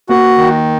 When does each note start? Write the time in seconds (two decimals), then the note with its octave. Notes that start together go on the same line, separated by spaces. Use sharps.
0.09 A#3 F#4
0.38 D#3